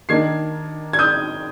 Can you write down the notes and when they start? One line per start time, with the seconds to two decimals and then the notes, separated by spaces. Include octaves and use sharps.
0.09 D#3 A#3 D4 G#6 C7
0.93 G#6
0.99 D#6 G6